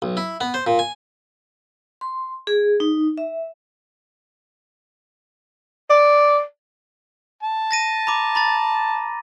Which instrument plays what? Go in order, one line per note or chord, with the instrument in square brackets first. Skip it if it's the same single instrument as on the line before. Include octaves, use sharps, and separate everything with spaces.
[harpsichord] B1
E4
B3
C5
A#2
G#5
[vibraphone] C6
G#4
D#4
E5
[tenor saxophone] D5
[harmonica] A5
[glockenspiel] A6 A#6 D#7
A#5 B5 D6
A#5 B5 A6